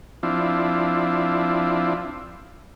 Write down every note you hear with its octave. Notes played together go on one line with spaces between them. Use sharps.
F3 C4 D4 E4